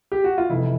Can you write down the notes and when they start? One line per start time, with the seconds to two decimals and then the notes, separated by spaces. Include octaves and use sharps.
0.12 G4
0.24 F#4
0.38 F4
0.50 F1 E2 C3 E4